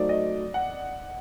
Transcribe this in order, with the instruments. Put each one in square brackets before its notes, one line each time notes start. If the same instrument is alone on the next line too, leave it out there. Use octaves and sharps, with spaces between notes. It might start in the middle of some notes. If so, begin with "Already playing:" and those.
Already playing: [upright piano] F#3 A3 D#4 F#4 C5 [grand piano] D5
[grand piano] D#5
F#5